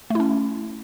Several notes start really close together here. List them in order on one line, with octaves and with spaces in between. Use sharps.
A3 E4 C#4